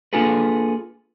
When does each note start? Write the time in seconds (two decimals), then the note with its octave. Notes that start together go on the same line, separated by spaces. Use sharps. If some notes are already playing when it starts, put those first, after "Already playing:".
0.13 A#3 D4 F4 G#4 A4 B4